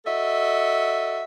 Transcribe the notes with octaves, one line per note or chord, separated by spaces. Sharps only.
F#4 A4 D#5 E5